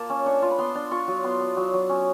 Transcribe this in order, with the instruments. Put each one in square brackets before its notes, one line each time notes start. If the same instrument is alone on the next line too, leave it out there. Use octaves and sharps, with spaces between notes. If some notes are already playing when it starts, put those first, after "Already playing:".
Already playing: [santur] A#3 F4 A5
C#4
D4 C#6
F4
B5
B3 C6
D4
F4 C#6
F#3
B3 C6
B3
F#3
F#3
C#4